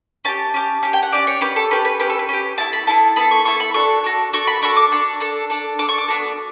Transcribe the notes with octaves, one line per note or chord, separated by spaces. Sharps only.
C#4 G4 A5
C#4 G4
C#4 G4
G5
F#5
C#4 G4 D5
C#5
C#4 G4 B4
A4
C#4 G4 B4
B4
C#4 G4 B4
A4
B4
C#4 G4
B3 E4 A4 A5
B5
B3 E4 A4 A5
B3 E4 A4 B5
C#6
B3 E4 A4 C#6
B5
D4 F#4 A4 C#6
D4 F#4 A4
D4 F#4 A4 C#6
B5
D4 F#4 A4 C#6
D6
D4 A4 C#6
D4 A4
D4 A4
D4 A4 D6
C#6
D6
B3 D4 F#4 A4